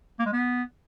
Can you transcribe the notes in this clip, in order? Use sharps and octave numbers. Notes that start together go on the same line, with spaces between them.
A#3
G#3
B3